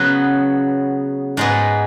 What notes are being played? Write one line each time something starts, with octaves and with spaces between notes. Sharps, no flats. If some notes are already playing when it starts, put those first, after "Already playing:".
Already playing: C#3 F#3 B3
G#2 G#3 B3